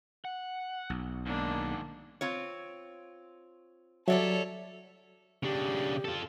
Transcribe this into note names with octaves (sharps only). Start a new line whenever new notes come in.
F#5
B1
G#2 D#3 A#3 D4
C4 F4 C#5
F#3 G3 A4 C#5 D5 E5
C#3 D4 G4
F4 A4